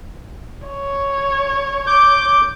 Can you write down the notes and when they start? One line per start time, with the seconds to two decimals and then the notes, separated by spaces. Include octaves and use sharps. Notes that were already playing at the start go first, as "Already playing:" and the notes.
0.67 C#5
1.87 D6 G6